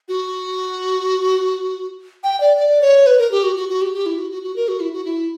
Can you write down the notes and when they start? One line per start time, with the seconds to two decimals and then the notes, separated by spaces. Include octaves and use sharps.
0.09 F#4
2.23 G5
2.40 D5
2.57 D5
2.81 C#5
3.06 B4
3.18 A#4
3.31 G4
3.43 F#4
3.56 F#4
3.69 F#4
3.82 G4
3.93 G4
4.06 E4
4.18 F#4
4.31 F#4
4.43 F#4
4.56 A#4
4.68 F#4
4.80 E4
4.93 F#4
5.05 E4